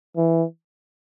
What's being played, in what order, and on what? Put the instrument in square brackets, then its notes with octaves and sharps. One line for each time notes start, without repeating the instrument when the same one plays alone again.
[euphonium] E3